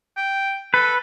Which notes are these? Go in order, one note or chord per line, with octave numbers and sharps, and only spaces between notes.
G5
A4 B4